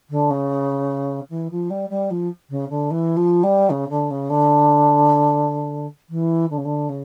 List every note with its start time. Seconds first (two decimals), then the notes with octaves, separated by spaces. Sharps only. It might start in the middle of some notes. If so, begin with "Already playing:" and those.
0.10 D3
0.30 C#3
1.30 E3
1.51 F3
1.70 G3
1.89 G3
2.10 F3
2.50 C#3
2.69 D3
2.90 E3
3.16 F3
3.43 G3
3.70 C#3
3.89 D3
4.10 C#3
4.29 D3
6.09 E3
6.50 D3
6.57 C#3
6.65 D3
6.89 C#3